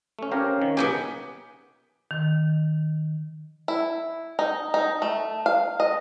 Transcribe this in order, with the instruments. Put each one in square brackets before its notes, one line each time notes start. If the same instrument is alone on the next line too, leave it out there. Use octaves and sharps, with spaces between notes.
[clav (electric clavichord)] A3 C#4
[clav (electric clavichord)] C4 G4 A#4 [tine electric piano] C#4 C#5 F5
[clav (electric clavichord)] D#3
[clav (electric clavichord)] B1 C#3 A#3 [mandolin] B3 D#4 G4 [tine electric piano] G#5
[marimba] D#3
[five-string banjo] E4
D#4
D#4
A3
F5
D#5